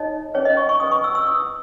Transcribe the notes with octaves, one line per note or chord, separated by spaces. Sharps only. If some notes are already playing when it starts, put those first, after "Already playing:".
Already playing: D#4 A4 C#5 D#5
C#4 G#4 B4 C#5
D#5
C#6
C#6
C#4 G#4 B4 D#6
C#6
E6
E6
E4 B4 D#6